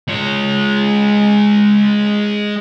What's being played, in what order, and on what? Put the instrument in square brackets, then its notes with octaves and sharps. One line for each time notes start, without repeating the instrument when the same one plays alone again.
[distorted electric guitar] G#3 C#5